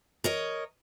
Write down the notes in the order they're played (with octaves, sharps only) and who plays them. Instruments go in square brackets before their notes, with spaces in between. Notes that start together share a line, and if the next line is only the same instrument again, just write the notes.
[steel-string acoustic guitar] A#4 C#5 D#5